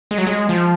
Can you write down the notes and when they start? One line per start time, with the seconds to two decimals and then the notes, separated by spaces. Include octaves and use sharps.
0.11 G#3
0.18 F#3
0.27 G#3
0.49 F3